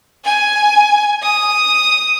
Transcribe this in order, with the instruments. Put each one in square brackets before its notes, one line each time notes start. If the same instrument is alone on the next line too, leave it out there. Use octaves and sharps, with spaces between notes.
[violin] G#5
D#6